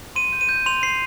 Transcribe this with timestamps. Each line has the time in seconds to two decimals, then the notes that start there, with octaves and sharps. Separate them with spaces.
0.16 C6 D#7
0.32 G6
0.41 D#7
0.49 G6
0.66 C6 F7
0.83 C6 C7